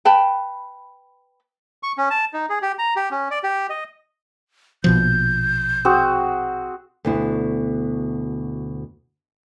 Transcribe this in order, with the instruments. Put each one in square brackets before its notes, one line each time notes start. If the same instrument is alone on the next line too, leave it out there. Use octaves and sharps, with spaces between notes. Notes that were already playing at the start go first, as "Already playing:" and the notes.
[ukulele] B4 G5 A5 B5
[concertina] C#6
C#4
A5
D#4
G#4
G4
A#5
G4
C#4
D5
G4
D#5
[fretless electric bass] A#1 B2 F3 [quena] G6
[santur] C4 F#4 G#4
[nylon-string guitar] D2 B2 E4